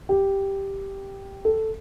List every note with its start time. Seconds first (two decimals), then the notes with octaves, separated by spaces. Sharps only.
0.09 G4
1.45 A4